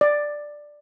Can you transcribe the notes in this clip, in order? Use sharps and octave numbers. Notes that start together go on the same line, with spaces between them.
D5